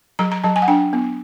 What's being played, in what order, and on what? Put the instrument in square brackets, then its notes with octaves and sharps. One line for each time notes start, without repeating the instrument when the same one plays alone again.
[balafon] F#3 A#5
A#5
F#3 A5
G#5
F#5
D4 G5
B3